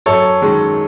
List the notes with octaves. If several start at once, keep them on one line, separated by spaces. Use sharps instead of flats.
F#2 A4 C#5
D#3 G#3 C#4